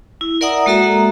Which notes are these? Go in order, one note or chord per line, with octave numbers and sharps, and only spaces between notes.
E4
A#4 D5 E5 F#5 A#5 D#6
G#3 A#3 F#4 A4 E5 A#5